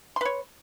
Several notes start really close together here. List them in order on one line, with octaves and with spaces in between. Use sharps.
C6 B4 C#5